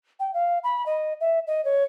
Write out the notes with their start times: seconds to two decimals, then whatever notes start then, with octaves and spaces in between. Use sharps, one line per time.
0.20 G5
0.34 F5
0.64 B5
0.86 D#5
1.21 E5
1.47 D#5
1.65 C#5